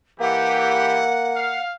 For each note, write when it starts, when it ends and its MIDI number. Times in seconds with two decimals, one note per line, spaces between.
0.20 1.08 52
0.20 1.58 58
0.20 1.08 67
0.20 1.61 78
1.35 1.75 77